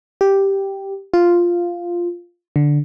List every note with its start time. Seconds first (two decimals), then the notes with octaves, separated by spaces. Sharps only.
0.21 G4
1.14 F4
2.56 D3